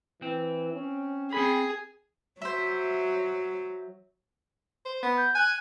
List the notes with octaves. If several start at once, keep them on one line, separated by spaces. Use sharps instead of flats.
E3 C4
C#4
C4 G#4 B5
F#3 C5 E5
C5
B3
G6
G#5 F#6